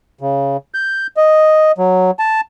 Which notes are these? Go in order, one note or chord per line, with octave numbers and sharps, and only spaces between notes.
C#3
G6
D#5
F#3
A5